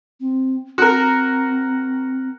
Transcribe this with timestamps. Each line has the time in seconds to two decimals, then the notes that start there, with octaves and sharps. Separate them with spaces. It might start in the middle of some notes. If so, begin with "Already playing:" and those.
0.20 C4
0.78 C4 F#4 A#4